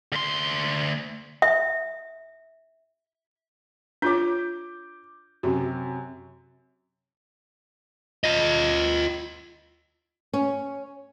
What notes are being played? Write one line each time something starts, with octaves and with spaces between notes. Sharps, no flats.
D2 C6
E5
D4 F4 C#5 D6 G6
F#2 C3 F#4
F4 D#5
C#4